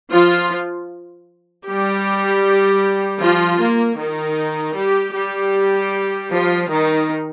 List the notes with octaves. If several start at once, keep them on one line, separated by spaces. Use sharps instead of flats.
F3 F4
G3 G4
F3 F4
A#3
D#3 D#4
G3 G4
G3 G4
F3 F4
D#3 D#4